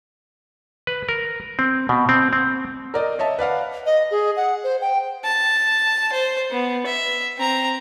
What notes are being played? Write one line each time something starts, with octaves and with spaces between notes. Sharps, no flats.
B4
A#4
C4
B2
C4
C4
A#4 D5 D#5
C#5 D#5 E5 A5
B4 D5 F5 F#5
D#5
G#4
F#5
C5
G5
A5
C5
B3
E5
C4 A#5